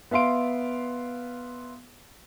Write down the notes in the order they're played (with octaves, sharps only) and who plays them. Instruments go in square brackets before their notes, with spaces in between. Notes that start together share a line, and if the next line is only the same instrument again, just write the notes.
[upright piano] B3 E5 F5 C6 D7